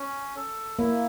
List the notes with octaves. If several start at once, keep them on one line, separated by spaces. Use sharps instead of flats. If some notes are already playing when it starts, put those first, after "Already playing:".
Already playing: C#4
A4
A#3 E4